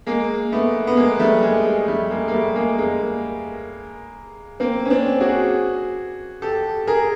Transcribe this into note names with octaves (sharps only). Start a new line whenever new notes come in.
G#3 A#3
A3 B3
B3
G#3 A#3
G3 A3
G#3
G#3
G3 A3
G#3 A#3
A#3
G3 A3
G#3 A#3
G#3 A#3
A#3 C4
C#4
C4 D4
F#4 G#4
G4 A4
G#4 A#4